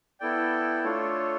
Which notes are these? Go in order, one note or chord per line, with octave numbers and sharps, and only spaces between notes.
B3 E4 A4 D5 G5
A3 D4 F4 A4 C#5